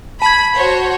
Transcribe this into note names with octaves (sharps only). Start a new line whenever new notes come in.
A5 B5 G#6
F#4 C5 C#5